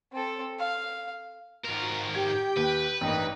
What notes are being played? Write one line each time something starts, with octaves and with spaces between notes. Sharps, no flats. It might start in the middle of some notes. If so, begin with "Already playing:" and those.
C4 A4
F5
G#2 F4 F#4 A#4
G4 G5 G#6
D#2 B4
A1 G2 A#3 D#4 G5